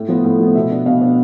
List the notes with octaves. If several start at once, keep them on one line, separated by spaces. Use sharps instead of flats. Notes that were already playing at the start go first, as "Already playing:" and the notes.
Already playing: A2
F3 B3
A2
F3 B3
B2 E5
B3 D4
B2 F5
B3 D4